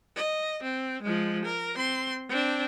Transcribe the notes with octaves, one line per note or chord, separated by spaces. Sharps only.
D#5
C4
F3 G#3
A#4
C4 C6
C4 D4